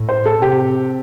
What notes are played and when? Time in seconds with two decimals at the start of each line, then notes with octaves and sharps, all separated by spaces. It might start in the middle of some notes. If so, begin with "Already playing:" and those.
Already playing: A2
0.09 C5
0.26 A4
0.42 C3 G4